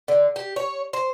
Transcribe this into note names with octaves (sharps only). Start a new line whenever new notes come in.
D3
G4
C#5
C5